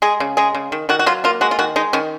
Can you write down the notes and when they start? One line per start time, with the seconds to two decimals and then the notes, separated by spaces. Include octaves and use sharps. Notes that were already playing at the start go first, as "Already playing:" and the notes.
0.02 G#3 G#4
0.20 C#3
0.37 G#3 G#4
0.54 C#3
0.72 D#3
0.89 D#3 F#4
0.99 F#4
1.06 F#3 F4
1.24 A#3 F4
1.41 G#3 F#4
1.51 F4
1.59 D#3 F#4
1.76 G#3 D#4
1.93 D#3 C#4